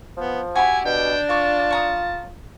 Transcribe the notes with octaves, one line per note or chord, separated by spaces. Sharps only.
F3 B3
E4 F#4 G4 G#5 B5
B2 D4 G5
F4 C#5 D5 A5
C#5 A#5 D#6